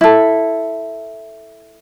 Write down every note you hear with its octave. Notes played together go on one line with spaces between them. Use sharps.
E4 A4